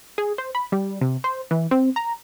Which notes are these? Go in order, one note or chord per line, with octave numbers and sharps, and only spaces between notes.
G#4
C5
B5
G3
C3
C5
E3
C4
A#5